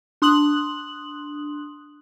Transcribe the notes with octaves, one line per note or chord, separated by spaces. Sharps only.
D4 C6 D#6 F#6 F#7